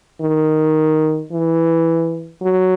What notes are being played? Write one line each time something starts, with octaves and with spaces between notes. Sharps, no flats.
D#3
E3
F#3